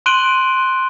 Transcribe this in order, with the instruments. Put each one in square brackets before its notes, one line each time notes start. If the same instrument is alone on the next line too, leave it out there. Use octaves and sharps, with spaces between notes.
[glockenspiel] C6 F#6 D7 D#7 F#7 G7